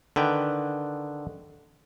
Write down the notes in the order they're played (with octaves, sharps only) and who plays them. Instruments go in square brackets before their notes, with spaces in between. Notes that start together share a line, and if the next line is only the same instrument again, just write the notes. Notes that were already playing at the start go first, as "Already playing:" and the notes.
[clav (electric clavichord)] D3 D#3 B4 G5